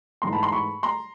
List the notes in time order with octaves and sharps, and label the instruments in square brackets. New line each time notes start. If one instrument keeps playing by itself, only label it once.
[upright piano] G#2 E3 A3 A#5 C6
A5 B5
A#5 C6
B5 C#6
A#5 C6